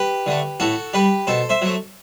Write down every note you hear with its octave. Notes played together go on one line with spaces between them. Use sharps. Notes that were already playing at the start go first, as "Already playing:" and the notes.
Already playing: G4 B4
D3 A3
A2 F#4 A4
G3 G4 B4
B2 A4 C5
C5 E5
F#3 A3